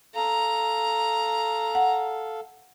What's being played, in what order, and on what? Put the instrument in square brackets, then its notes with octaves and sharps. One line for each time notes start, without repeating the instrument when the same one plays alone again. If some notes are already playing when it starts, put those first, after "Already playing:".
[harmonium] A4 F5 [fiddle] A#5
[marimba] F#5